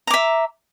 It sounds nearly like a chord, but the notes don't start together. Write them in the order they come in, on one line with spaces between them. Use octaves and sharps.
A#5 D6 E5